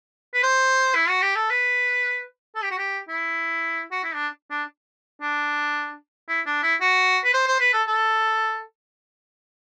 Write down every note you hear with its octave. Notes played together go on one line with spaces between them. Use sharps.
B4
C5
E4
F#4
G4
A4
B4
A4
G4
F#4
G4
E4
F#4
E4
D4
D4
D4
E4
D4
E4
F#4
B4
C5
C5
B4
A4
A4